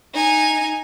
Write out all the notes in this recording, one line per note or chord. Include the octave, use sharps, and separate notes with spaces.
D#4 G#5